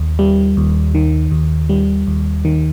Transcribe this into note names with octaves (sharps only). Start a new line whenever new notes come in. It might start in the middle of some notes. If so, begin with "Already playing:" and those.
Already playing: D#2
G3
D#2
D#3
D#2
G3
D#2
D#3